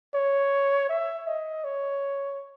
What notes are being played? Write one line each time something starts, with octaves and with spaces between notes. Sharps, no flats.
C#5
E5
D#5
C#5